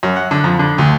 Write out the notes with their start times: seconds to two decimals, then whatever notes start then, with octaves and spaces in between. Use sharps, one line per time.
0.03 F#2
0.16 F#5
0.31 D3
0.44 F2
0.59 D3
0.78 D2